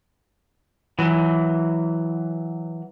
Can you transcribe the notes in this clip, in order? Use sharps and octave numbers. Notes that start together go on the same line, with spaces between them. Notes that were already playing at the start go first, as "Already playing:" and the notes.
E3 F#3